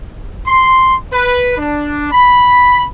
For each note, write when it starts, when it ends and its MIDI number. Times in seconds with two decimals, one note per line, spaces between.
0.46 0.94 84
1.12 1.54 71
1.58 2.08 62
2.12 2.84 83